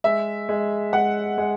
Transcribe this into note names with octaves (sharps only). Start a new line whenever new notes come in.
G#3 E5
G#3
G#3 F#5
G#3